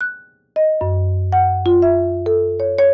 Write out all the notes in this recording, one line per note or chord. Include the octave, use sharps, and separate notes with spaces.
F#6
D#5
F#2
F#5
F4
E5
A4
C#5
C#5